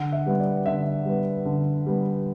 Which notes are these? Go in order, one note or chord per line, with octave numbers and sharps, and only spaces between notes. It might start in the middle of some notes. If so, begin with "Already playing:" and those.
Already playing: D3 F#5
E5
G3 B3
D5
D3 E5
G3 B3
D3
G3 B3